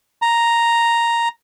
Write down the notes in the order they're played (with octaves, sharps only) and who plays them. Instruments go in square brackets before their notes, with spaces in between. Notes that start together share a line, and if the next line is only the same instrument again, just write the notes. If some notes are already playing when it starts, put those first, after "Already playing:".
[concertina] A#5